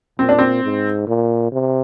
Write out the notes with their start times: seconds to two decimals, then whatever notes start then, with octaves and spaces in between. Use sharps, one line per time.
0.19 A#2 C4
0.29 D4
0.39 C4
0.63 G#2
1.07 A#2
1.52 C3